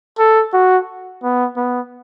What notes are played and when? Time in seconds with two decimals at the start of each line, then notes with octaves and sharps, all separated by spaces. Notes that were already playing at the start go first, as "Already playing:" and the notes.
0.19 A4
0.54 F#4
1.23 B3
1.57 B3